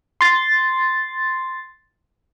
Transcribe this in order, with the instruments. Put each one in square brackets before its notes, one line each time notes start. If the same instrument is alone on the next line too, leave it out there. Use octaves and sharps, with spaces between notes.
[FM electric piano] C6 A6